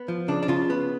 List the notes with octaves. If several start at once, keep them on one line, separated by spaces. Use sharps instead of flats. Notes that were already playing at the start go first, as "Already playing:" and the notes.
Already playing: B3
F3
C#3 D4
D4
C#3 F4
B3